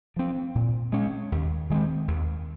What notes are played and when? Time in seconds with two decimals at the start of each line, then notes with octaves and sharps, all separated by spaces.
0.16 F3 C4
0.55 A#2
0.92 G#3 C#4
1.32 D#2
1.70 D#3 G#3 C4
2.08 D#2